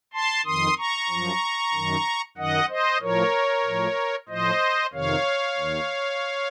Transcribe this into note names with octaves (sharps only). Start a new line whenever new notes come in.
A5 C6
F2 D#3 C6 D#6
A#5 C#6
F#2 F3
F#2 D#3
F#2 D#3 D#5 F#5
C5 D#5
A2 F3 A#4 C#5
A2 F3
A2 F3 C5 D#5
F2 C3 D#3 C#5 F5
D#2 D#3